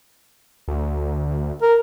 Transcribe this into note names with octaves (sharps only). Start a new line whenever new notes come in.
D2
A#4